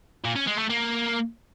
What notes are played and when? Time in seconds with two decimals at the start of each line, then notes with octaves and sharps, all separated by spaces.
0.25 A#2
0.36 C#4
0.47 G#3
0.59 A3
0.70 A#3